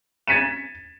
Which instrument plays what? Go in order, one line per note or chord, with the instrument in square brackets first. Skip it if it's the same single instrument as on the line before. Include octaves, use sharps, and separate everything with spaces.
[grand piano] G#6 A6 B6 C#7 D#7 E7